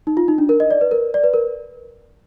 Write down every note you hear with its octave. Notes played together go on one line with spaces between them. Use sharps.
D#4
F4
D#4
D4
A#4
D#5
D5
B4
A#4
D5
B4
A#4